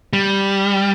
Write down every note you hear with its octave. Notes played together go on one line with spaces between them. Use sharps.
G3